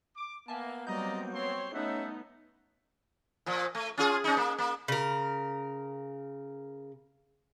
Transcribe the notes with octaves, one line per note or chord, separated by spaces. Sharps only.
D6
A#3 B3 E5 G#5 A5
F#3 G3 A#3 C4 D5 D#5 A#5 G6
C4 C#5 C6
A3 B3 C#4 D#4 A4 E5 F#5
A#2 F3
A3
C#4 F4 G#4
C#4 D#4
A#3
A#3
C#3 A#4